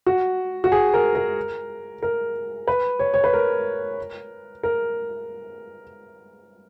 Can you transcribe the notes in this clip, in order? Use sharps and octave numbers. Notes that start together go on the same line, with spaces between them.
F#4
F#4
G#4
A#4
A#4
A#4
B4
C#5
C#5
B4
A#4
A#4